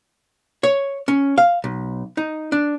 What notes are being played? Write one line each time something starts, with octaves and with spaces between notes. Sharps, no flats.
C#5
C#4
F5
B1
D#4
D4